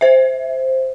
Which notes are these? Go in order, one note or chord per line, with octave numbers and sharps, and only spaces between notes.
C5 E5